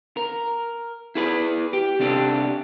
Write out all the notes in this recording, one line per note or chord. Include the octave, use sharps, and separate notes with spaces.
A#4
E4 G#4 B4
G4
C3 D4 G4 A4